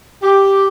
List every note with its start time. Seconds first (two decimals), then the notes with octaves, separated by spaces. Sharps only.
0.22 G4